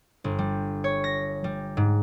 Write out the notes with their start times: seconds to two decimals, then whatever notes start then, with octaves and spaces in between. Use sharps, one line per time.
0.24 G1
0.39 G3
0.84 C#5
1.04 A#6
1.44 G3
1.77 G#2